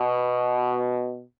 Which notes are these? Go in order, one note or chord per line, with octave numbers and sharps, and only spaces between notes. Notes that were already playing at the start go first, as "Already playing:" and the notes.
Already playing: B2